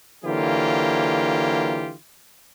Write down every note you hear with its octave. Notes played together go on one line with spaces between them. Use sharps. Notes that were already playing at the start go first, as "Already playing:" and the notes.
D3 E3 F#3 A#3 F4 G4